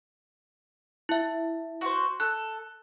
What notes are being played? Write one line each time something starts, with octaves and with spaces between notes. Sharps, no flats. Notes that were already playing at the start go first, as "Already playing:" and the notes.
E4 E5
F#4 C5
A4 F#6